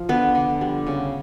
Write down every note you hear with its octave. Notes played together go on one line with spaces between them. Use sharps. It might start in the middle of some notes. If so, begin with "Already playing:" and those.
Already playing: F3
D3 B3
D3
G3
C#3